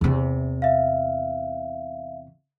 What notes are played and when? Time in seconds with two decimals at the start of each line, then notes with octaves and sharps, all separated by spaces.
0.01 E2 C3
0.62 E5 F5